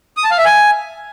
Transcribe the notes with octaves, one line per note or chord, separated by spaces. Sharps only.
D#6
A5
F5
E5
G#5